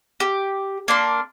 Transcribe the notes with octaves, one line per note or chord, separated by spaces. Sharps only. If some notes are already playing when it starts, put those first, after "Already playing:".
G4
A#3 D4 C6